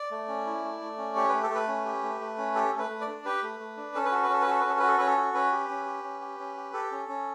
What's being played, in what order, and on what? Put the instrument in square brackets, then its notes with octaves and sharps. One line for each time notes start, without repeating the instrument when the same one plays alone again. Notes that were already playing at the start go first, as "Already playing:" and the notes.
Already playing: [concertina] D5
A3
C#4
E4
A3
A3
C#4
G4 C#5
A3 B4
A4
A3 B4
C#4
G4
A3
A3
C#4
G4 A4
A3
B4
A3
D5
D4
G4 B4
A3
A3
D4
C#4 A4
B4
F#4 A4
B4
C#4 A4
B4
F#4 A4
B4
C#4 A4
F#4 B4
A4
C#4 B4
A4
F#4
C#4 B4
G4
C#4
G4
C#4
G4
C#4
G4
G4 A4
C#4
C#4